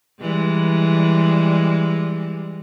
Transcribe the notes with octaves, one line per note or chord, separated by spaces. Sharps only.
E3 G3 G#3